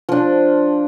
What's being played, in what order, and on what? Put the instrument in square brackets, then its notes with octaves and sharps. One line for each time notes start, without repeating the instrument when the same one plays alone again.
[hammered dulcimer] F3 D4